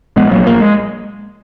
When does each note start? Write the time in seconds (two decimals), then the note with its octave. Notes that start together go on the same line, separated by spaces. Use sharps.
0.16 A#1 G#3 B3
0.31 A#1 F#3 A#3
0.47 A#1 A#3
0.60 G#3